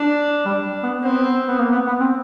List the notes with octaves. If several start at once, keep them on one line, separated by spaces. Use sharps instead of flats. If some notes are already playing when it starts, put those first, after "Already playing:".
Already playing: D4
G3
B3
B3 C4
B3
A#3
B3
B3
C4